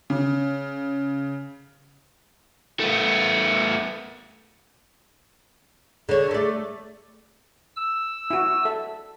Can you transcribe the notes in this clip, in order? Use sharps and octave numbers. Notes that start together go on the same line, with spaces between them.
C#3
A3 B3
D3 G#4 C#5
A3 D5
E6
E4 F#4
A4 E5